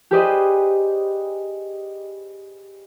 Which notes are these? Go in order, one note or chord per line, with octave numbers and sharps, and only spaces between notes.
G4 G#4 B4 C5 D5 D#5